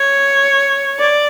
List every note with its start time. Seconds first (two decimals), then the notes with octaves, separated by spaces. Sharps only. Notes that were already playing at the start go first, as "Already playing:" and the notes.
Already playing: C#5
0.99 D5